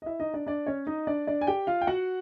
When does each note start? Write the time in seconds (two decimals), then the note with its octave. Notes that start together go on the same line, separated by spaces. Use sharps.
0.02 D#5
0.06 E4 E5
0.20 D#4 D#5
0.34 D4 D5
0.47 D4 D5
0.66 C#4 C#5
0.87 D#4 D#5
1.07 D4 D5
1.27 D4 D5
1.41 G#5
1.47 G4 G5
1.67 F4 F5
1.81 G5
1.87 F#4 F#5